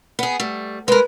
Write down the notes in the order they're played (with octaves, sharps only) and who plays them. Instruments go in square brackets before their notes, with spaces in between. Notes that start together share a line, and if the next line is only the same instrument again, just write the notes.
[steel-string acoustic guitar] B3 G#4
G3 A3
[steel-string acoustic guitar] G#3 A#4 [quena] B4